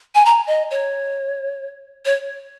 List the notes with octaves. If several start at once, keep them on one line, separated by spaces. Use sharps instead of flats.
G#5
A#5
D#5
C#5
C#5